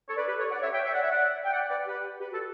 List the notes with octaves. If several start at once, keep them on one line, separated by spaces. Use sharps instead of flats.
A4 C#5
B4 D5
G4 B4
A4 C#5
D5 F#5
C#5 E5
E5 G5
C#5 E5
D5 F#5
C#5 E5
D5 F#5
G5
D5 F#5
B4 D5
G4 B4
G4 B4
F#4 A4